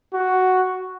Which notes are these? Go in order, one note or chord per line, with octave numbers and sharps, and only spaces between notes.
F#4